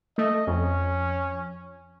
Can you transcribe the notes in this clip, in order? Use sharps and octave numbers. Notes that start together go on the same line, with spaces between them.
A3 D#5
F2 C#4